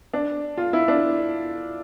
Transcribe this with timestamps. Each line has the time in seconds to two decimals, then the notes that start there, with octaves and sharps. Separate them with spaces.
0.14 D4
0.57 F4
0.73 E4
0.88 D4